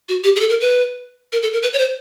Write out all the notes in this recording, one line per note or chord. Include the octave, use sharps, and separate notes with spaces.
F#4
G4
G#4
A4
A#4
B4
A#4
A4
A#4
B4
C#5
C5